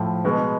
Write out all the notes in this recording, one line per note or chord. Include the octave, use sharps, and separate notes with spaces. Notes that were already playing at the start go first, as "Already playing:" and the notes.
Already playing: A2 F3 A3
B2 G#3 B3